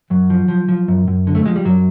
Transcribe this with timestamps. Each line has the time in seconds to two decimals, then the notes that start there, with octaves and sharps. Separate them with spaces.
0.10 F#2 F#3
0.30 F3
0.48 F3
0.69 F3
0.88 F#2
1.08 F#2
1.27 D3
1.35 A3
1.46 F3 G#3
1.56 G3
1.65 F#2 F#3